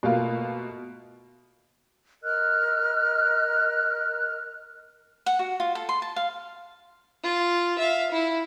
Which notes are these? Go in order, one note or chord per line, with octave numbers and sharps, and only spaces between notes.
B2 A3 A#3 F4
A#4 D#5 F6 F#6
F#5
F#4
F4
A4
C6
A5
F5
F4
E5 F5
E4